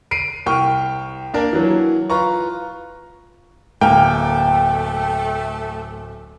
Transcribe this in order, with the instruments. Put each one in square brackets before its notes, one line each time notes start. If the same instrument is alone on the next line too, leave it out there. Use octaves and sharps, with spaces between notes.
[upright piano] C7 D7 D#7
C2 G5 C#6 F6
A#3 D4 A#4
E3 F#3
F4 B4 A#5 C#6
[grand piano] D1 [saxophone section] A3 [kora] A#3 [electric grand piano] G5